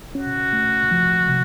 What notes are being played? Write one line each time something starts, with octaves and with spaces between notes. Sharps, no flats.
C#4 F#4
A3
F3
C3